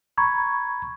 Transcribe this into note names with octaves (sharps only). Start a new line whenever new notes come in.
A#5 B5 C#6 G#6